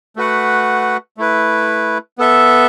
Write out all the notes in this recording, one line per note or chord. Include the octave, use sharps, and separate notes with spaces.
A3 F#4 B4 F#5
A3 E4 B4
B3 A4 E5